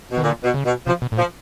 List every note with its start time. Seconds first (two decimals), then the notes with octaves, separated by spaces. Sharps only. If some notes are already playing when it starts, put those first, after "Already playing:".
0.11 B2
0.18 D#3
0.23 A#2 D3
0.44 B2
0.54 C#3
0.65 B2
0.87 C3 F3
1.02 B2
1.12 A2
1.18 A#2 F3